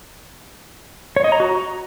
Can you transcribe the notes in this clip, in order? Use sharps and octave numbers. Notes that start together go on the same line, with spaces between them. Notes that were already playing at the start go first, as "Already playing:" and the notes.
C#5
D#5
A#5
F#4